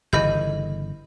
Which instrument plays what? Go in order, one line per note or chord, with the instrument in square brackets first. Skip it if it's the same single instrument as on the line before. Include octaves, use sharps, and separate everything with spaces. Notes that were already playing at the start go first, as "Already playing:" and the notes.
[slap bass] G1 C#3 E3 [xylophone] D#5 B5 G6